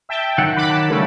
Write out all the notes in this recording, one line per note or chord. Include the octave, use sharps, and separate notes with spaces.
E5 G5 A5
D#3 F#3 F#5
B5 D6 F#6
A5
C#3 G3 A3